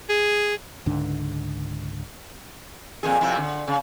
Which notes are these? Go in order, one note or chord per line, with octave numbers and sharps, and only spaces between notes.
G#4
C#2 G#2 D3 D4
F2 A#2 G#4
F2 C3 E4
D3
C#3